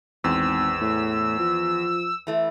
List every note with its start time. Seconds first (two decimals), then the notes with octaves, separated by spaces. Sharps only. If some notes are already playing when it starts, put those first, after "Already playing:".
0.24 G#1 E2 C4 E6
0.82 A2
1.39 F3
2.27 E3 A3 E4